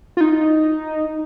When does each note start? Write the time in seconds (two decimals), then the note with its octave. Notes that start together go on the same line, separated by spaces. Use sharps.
0.17 F4
0.21 D#4